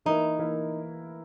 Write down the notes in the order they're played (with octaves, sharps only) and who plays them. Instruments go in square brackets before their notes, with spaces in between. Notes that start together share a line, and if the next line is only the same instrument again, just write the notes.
[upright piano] E3 A#3 E4 A#4 [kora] D#4
[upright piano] E3 A#3 E4 A#4